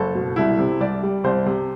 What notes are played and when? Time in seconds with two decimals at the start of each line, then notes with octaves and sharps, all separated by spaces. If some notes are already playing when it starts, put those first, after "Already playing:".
Already playing: F#1 A4
0.15 B2
0.36 C2 E4
0.59 C3
0.80 C2 D5
1.03 G3
1.24 C2 C5
1.46 C3